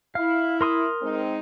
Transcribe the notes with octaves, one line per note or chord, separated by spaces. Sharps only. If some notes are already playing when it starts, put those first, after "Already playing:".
E4 F5
A#4 C6 D#6
G#3 C4 D#4